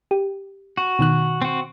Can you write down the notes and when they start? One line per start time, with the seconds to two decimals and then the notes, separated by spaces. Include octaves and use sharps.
0.11 G4
0.77 F#4
0.99 B2 D#3 F#6
1.42 C4 F#4